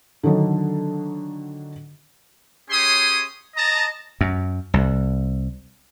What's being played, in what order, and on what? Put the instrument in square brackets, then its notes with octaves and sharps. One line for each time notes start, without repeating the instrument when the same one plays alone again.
[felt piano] D3 D#3 F#3 D4 D#4
[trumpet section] C#4 G4 G#4 C#5 C6 D#6
D#5 A5 A#5
[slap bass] F#2
C2